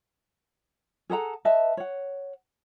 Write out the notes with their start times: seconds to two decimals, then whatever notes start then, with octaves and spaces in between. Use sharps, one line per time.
1.10 G#4 A4 F#5 A#5
1.45 B4 D#5 E5 A5
1.77 C#5 F#5